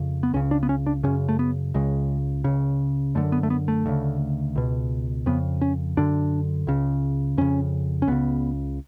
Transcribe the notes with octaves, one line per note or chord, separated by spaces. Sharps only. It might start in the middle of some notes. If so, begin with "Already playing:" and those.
Already playing: F2 C#3
B3
C#2 C#3 C#4
D4
B3
C#4
D4
F#2 C#3 C#4
A3
B3
C#2 C#3 G#3
C#2 C#3
F#2 D3 A3
B3
A3
B3
A3
D2 C#3
C#2 B2
F2 C#3 B3
C#4
F#2 D3 D4
C#2 C#3
F2 C#3 C#4
C#4
C#2 C#3 B3